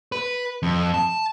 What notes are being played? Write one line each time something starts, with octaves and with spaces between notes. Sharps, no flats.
B4
F2
A5